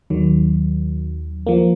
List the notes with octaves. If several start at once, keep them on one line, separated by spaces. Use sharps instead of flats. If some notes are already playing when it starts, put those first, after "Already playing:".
D#2 D#3 F#3
F3 A#3